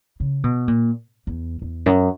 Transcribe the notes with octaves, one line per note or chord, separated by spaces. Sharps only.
C#3
B2
A#2
E2
E2
F#2